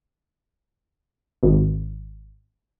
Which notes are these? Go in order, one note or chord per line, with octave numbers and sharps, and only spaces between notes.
G#1